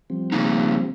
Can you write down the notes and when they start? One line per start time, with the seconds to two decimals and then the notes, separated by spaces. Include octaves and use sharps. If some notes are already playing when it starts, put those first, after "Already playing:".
0.10 F3 G3 C4
0.32 C#3 A#3 D#4